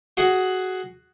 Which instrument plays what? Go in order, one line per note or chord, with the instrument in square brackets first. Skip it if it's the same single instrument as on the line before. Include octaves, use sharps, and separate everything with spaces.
[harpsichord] F#4 G#4 F#5